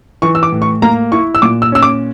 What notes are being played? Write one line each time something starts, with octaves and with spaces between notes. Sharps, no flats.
E3 C#6
E6
D6
A2
C#6
A#3 A#5
E4 C#6
E6
A#2 D6
E6
C#4 E6
D6